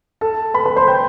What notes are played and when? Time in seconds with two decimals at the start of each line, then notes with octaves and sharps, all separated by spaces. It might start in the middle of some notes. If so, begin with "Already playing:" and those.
0.21 A4 A5
0.54 B4 B5
0.65 B4 B5
0.76 C5 C6
0.88 G5 G6